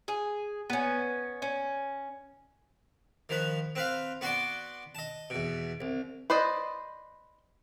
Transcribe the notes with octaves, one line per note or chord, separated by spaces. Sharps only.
G#4
B3 C#4
C#4
D#3 F3 B4
C4 B4 F5
B3 F#4 D5 C6 D6
D#5 A5
E2 B2
C2
B4 C5 D5 D#5